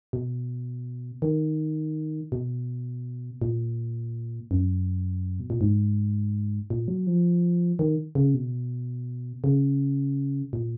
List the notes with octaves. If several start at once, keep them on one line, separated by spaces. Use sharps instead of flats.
B2
D#3
B2
A#2
F#2
B2
A#2
G#2
A#2
F#3
F3
D#3
C#3
B2
C#3
A#2